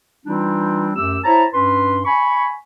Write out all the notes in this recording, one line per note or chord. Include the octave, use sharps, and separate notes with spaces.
E3 G3 C4 D4 D#4 F4
F#2 A3 G4 E6
E4 C5 C#5 A5 A#5
G2 C#4 B4 C6
G#5 B5 C#6